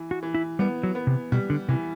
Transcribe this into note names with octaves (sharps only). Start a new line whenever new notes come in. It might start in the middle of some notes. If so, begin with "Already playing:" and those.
Already playing: E3
F#4
E3
E4
G3 B3
F#3
B3
C3
B2 G3
D3
C3 E3